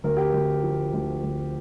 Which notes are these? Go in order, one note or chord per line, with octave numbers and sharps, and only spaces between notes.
D2 A#4
G4
D2 A#4
F3
D2
D2